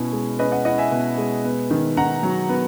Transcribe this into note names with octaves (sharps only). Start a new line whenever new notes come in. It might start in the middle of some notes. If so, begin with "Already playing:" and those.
Already playing: B2 C#4 E4
G#3
C#4 B4 D#5
D#5 F#5
E4 D#5 F#5
E5 G#5
B2
G#3
B3
D#3
D#3 F#5 A#5
F#3
B3